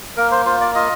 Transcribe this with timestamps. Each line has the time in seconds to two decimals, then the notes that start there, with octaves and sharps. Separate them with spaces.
0.17 A#3 A#4
0.31 C5
0.45 F4 C5
0.61 D5
0.75 F4 D#5